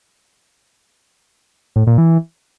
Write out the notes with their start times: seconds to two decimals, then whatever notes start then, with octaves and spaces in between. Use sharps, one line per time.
1.76 A2
1.87 A#2
1.98 E3